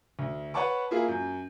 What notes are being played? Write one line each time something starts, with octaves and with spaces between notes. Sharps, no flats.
D2
B4 C#5 F#5 A5 C#6 D6
A#3 E4 F4 G#4
F#2